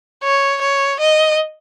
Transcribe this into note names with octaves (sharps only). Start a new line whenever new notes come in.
C#5
C#5
D#5